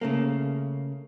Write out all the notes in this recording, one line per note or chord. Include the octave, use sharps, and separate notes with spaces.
C#3 A3 A#3